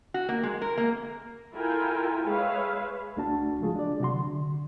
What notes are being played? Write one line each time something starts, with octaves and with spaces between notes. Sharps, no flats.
F#4
A#3
G#3
A#4
A#3
E4 F4 A4 A#4 G5 G#5
G#3 G#4 B4 C#5 E5 F5
C#2 A3 D4 F#4 A5
C#3 F3 G#3 A3 F4 G#4
D4 D5
C3 F#3 F#4 C6
D3